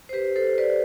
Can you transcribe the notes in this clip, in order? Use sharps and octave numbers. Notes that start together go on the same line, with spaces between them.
C5
G4 B4
A4 C5
B4 D5